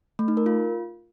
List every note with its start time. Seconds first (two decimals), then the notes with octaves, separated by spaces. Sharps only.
0.19 A3
0.28 D#4
0.37 A#4
0.46 F4